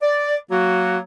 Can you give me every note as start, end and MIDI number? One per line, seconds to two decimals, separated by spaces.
0.01 0.36 74
0.50 0.99 54
0.50 0.99 58
0.50 0.99 66